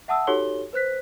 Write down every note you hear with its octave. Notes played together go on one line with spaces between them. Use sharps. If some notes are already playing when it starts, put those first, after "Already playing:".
E5 F#5 A5 D#6 E6
D#4 F#4 G4 A4 C#5 G7
B4 C5 F#6 B6